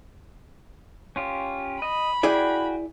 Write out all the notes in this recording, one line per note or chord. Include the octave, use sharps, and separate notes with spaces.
C#4 F4 G4
D#5 B5
E4 F#4 G#4 D5 G5 G#5